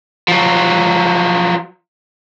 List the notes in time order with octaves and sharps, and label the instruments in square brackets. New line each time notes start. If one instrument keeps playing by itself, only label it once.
[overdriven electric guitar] F3 F#3